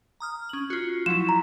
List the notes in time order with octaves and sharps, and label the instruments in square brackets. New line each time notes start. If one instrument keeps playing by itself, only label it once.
[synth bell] A#5 D#6 F6
C#4 F#7
F4 F#4
[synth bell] F3 F#3 E4 [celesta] E7
[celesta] A#5